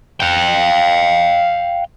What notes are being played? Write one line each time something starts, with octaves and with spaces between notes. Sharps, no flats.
F5 G5